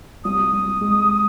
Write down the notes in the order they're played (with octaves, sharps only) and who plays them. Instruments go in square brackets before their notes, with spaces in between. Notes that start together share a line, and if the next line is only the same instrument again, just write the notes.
[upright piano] C2 [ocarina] D#6
[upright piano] C2
G#3